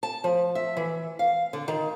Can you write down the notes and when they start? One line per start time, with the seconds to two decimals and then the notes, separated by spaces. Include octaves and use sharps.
0.03 A5
0.24 F3
0.55 E5
0.77 E3
1.19 F5
1.53 D3
1.68 D#3